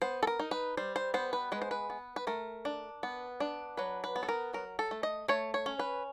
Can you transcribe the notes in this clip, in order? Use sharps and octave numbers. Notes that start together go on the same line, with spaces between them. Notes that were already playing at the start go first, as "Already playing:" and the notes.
B3 C5
A4
A#4
D#4
B4
G3 C5
C5
B3 C5
B4
G#3 B4
C5
B4
B3
B4
A3 A#4
D4
B3
D4
F#3 B4
B4
B3
A4
A#4
F#3 A#4
A4
A3
D#5
A3 C#5
C#5
C#4
B4